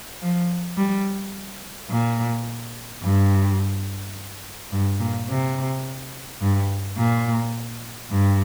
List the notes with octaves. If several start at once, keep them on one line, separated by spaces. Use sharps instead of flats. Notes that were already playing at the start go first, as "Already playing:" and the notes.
F3
G3
A#2
G2
G2
A#2
C3
G2
A#2
G2